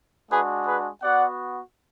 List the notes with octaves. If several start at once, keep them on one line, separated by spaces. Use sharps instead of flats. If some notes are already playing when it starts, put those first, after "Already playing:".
G#3 D4 F#4 G#4 B4
G#4 B4
B3 F#4 D5 F#5